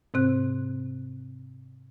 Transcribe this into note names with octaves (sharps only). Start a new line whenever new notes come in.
G#2 C3 C4 F#6